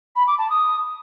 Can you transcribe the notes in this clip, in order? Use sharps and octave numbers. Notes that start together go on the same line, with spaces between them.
B5
D6
A5
D#6